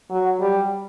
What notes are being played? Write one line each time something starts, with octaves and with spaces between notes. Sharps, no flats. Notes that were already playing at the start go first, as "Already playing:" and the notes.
F#3
G3